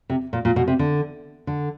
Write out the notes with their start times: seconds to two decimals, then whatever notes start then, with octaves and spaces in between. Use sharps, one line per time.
0.10 C3
0.33 A#2
0.45 A#2
0.56 B2
0.68 C3
0.79 D3
1.47 D3